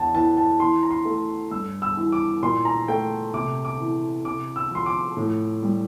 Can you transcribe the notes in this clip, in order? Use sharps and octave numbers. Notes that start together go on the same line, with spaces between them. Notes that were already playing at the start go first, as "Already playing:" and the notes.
Already playing: E2 A5
E3 A5
A5
E3 C6
A#5
C6
A3
G2 E6
E6
E3
D6
A#2 C6
A#5
A3 G5
C3 D6
D6
E3
C3 D6
E6
F3 C6
D6
A2
G3